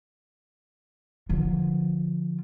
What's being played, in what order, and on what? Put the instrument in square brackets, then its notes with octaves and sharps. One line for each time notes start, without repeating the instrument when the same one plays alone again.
[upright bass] D3 F3